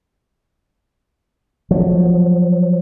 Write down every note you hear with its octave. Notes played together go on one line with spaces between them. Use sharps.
F3 F#3